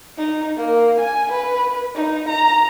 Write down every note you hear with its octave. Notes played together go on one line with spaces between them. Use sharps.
D#4
A#3
G#5
B4
D#4
A#5